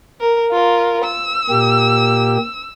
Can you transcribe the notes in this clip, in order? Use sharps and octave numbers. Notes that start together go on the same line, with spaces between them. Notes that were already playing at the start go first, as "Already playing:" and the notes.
A#4
F4 A#4
E6
A#2 A#3 G4